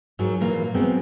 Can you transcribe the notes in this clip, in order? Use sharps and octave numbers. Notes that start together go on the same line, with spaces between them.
G#2 F#3 F4 G#4 A#4
A#2 E3 A#3 F4 F5
F3 F#3 G#3 B3 C4